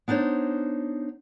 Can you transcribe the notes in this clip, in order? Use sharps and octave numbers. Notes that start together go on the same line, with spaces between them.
B3 D4 D#4 C5 C#5